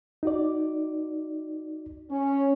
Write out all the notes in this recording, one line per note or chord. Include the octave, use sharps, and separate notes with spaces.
D#4 F#4 D5
C#4